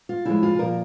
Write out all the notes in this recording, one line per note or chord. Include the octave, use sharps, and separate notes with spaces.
F4
C#3 F3 G#3 E4
F4
A#2 F3 A#3 A#4